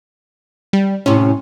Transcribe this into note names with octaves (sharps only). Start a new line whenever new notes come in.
G3
A2 C3 C#4